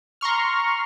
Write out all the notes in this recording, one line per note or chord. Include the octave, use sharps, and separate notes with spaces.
A#5 C6 C#6 F6